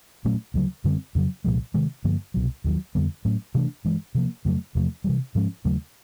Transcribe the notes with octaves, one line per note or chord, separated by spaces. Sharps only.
A#2 F#3 A3 C#4
D2 C#3 F#3
F#2 D3 G3 C4
F2 C#3 F#3
C2 A#2 F3 G#3
C3 D#3 G#3
G2 D3 F3 A#3
C2 B2 F#3
D#2 D#3 F#3
F2 D3 G3 B3
A2 F#3 A3 C#4
C3 E3 A3 D4
G2 E3 G#3
C3 F3 A#3
F2 C#3 F#3 A3
E2 C3 F3 A3
C3 E3 G3
G#2 F3 G#3 C#4
D#2 C#3 F#3 A3